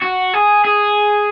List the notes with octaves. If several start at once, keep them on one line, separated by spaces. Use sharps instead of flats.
F#4
G#4
G#4